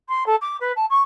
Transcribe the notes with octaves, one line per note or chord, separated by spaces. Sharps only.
C6
A4
D6
B4
A5
C#6